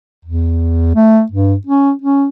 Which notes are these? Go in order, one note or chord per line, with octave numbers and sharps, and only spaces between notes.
E2
A3
G2
C#4
C#4